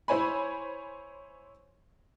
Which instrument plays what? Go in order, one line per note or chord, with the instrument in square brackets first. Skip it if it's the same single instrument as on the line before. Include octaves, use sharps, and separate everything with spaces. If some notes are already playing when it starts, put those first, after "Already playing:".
[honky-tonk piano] E4 C5 C#5 G#5 B5